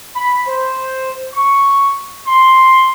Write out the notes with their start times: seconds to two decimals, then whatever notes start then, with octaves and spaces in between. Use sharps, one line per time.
0.15 B5
0.46 C5
1.33 C#6
2.26 C6